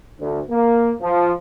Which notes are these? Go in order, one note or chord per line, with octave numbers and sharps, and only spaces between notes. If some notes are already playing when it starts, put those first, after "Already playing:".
D2
A#3
F3